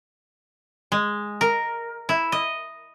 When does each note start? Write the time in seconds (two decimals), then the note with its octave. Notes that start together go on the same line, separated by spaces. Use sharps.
0.92 G#3
1.41 A#4
2.09 E4
2.32 D#5